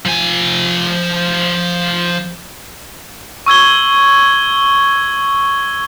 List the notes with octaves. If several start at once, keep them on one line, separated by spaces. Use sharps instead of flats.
F3 G#5
C#6 E6 G#6 G7